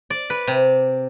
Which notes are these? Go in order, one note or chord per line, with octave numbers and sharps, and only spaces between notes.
D5
B4
C3